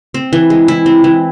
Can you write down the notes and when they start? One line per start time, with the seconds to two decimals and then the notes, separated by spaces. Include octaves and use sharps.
0.14 C4
0.33 E3
0.50 G#3
0.68 E4
0.86 C4
1.04 E3